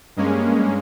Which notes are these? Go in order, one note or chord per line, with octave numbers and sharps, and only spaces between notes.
G2 G#3 A#3 C#4